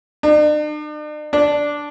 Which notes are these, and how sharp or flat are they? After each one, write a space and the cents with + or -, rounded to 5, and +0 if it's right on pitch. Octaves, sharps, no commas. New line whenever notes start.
D4 +45
D4 -5